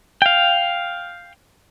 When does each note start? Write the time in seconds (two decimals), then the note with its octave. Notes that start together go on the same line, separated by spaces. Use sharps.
0.22 F5 G5